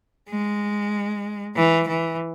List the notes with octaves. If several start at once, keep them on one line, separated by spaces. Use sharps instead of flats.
G#3
E3
E3